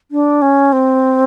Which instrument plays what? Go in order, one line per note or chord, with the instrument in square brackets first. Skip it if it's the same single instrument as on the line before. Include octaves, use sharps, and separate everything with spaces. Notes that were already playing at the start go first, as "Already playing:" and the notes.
[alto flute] D4
C#4
C4